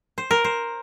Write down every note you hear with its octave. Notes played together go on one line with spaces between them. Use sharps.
C5
A#4
C5